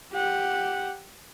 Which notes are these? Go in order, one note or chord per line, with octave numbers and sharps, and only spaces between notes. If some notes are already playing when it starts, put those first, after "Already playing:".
G4 F#5